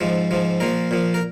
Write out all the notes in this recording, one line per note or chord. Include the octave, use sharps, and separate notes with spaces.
G#2 F3
G#2 F3
A#2 F3 A#4
A#2 F3
A#4